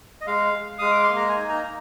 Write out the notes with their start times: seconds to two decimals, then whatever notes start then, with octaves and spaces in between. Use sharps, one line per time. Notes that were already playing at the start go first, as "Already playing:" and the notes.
0.21 D#5
0.27 G#3 F5
0.54 G#3
0.78 G#3 D#6
0.91 D6
1.03 C6
1.09 A#3
1.16 A#5
1.29 G#5
1.36 D#4
1.49 A#5
1.63 D#4